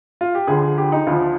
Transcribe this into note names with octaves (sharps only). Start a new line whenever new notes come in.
F4
G4
D2 D3 F3 G#4
G4
D#4
D2 D3 F3 F4